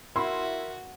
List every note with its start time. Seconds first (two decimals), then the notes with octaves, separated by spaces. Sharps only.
0.16 E4 F#4 A#4 E5 C6